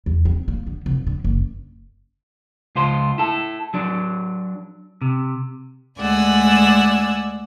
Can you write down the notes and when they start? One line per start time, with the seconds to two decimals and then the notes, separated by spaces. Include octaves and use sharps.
0.06 E2
0.25 C4
0.48 A#3
0.67 D3
0.86 F1
1.07 D3
1.24 F#1
2.76 C#2 F4 C5
3.18 E4 A4
3.74 F#3 D4
5.01 C3
5.99 D2 G#3 D5 F#5 G#5 E6